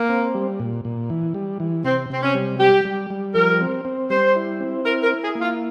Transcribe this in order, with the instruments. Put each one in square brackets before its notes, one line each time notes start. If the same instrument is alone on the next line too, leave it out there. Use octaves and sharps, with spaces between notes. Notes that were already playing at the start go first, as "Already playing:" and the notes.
Already playing: [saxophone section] A#3
[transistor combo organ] C4
G3
A#2
A#2
E3
G3
E3
[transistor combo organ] C3 [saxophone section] C4
[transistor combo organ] C3 [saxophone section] C4
[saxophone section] C#4
[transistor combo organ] G3
[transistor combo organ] G3 [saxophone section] G4
[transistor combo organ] G3
G3
[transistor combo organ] F3 [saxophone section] A#4
[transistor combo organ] C4
C4
[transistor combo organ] G3 [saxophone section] C5
[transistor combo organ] E4
C4
[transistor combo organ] E4 [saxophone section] A#4
[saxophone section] A#4
[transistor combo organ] E4
[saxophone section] G#4
[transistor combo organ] A#3
[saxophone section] F4